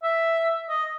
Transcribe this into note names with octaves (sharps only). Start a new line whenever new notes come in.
E5
D#5